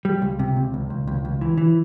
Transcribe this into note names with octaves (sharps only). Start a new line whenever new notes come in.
G3
C#2
C3
C#2
C#2
C#2
C#2
C#2
E3
E3